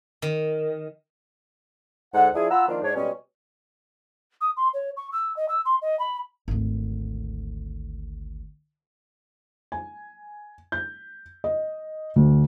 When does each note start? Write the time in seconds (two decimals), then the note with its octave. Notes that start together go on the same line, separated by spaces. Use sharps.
0.22 D#3
2.14 D2 G#2 F#5
2.34 F3 D4 E4 G#4
2.51 F4 F#5 A#5 B5 E6
2.67 D#3 F3 A#3 D4 D#4 F4
2.83 G#2 D4 C#5
2.95 B2 G3 G#3 C#4
4.41 D#6
4.57 C6
4.74 C#5
4.97 C#6
5.12 E6
5.37 D#5
5.49 E6
5.66 C6
5.82 D#5
5.99 B5
6.48 G#1 D2
9.72 G#5
10.72 G6
11.44 D#5
12.16 D2